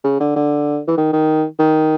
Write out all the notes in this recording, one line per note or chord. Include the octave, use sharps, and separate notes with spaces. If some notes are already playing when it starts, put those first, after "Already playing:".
C#3
D3
D3
E3
D#3
D#3
D#3